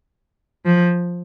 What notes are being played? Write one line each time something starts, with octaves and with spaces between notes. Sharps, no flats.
F3